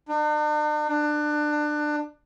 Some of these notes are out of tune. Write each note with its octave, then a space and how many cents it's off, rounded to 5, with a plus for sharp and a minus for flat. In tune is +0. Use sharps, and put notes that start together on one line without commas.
D4 +45
D4 +25